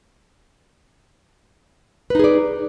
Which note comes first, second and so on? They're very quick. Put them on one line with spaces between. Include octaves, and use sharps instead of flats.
B4 D#4 G#4 D5